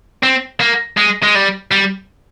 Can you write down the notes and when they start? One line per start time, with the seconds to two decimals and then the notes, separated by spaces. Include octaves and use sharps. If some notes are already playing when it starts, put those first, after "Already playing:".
0.23 C4
0.61 A#3
0.97 G#3
1.23 G#3
1.35 G3
1.71 G3